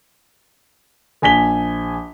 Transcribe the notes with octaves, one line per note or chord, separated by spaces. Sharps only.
A#1 G#5 B6 G7